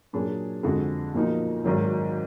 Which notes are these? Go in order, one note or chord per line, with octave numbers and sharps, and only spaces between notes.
A#2 F#3 D4 G#4
F2 D3 G#3 D4 F#4
B1 A#2 F3 A#3 D#4
G#1 G#2 D#3 F#3